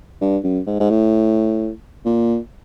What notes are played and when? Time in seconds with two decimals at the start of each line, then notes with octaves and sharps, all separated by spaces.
0.21 G2
0.43 F#2
0.66 G#2
0.80 G#2
0.90 A2
2.05 A#2